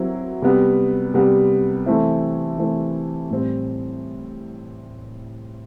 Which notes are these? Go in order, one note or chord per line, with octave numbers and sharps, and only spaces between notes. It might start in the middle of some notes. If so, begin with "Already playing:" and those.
Already playing: F#3 C4 E4
C3 G3 B3
C3 G3 B3
E3 A3 C4 E4
E3 A3 C4 E4
A2 G3 C4